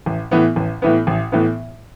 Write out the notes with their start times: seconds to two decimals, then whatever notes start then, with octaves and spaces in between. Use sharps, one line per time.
0.06 A1
0.31 A2 E3 B3
0.56 A1
0.82 A2 E3 B3
1.07 A1
1.32 A2 E3 B3